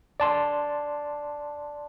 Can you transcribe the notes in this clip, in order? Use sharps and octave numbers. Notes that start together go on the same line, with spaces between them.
D5 A5 C6